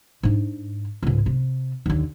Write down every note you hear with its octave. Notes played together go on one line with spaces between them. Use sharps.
G#2 D4
C#2 G#2
C3
D#2 D3